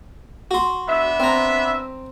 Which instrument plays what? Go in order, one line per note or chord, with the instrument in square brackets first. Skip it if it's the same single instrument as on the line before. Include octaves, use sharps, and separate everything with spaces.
[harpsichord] F#4 C6
[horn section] B3 D4 E5
[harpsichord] C4 A#5